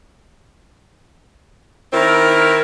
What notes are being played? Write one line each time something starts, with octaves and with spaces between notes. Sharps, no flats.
D#3 C4 E4 A#4